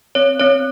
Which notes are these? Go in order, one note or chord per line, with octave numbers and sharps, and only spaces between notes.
C4 C#5
C4 C#5